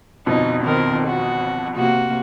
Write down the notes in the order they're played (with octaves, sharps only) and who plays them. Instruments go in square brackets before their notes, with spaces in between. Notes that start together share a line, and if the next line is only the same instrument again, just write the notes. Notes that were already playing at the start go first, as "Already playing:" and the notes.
[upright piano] G1 F2 B2 [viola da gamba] D#4
[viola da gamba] D#3 C4 A#4
F#4
C3 A#3 F#4